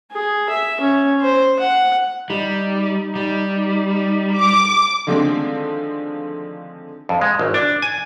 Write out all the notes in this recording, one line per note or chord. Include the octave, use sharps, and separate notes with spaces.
G#4
E5
C#4
C5
F#5
G3 D#4
G3
D6
D3 D#3 F3 G#3 A3 C4
F2
G#3
G#1
D4
G#5